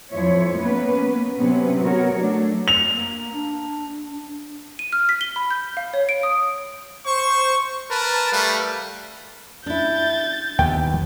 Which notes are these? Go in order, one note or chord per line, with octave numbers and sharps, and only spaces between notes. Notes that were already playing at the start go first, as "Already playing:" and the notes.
F2 F3 E4 C#5
A#3 B3 C#4 B4
C3 F#3 B3 C#4
B3 F#4 A#4 C#5
F#3 A3 D4
F7
A#3
D4
D#7
F6
B6
G7
B5
G6
F5
C#5
D7
D#6
C5 C#6
A#4 B4 A5
G3 A3 B4 F5
D4 E4 G6 A6
D#2 B3 G5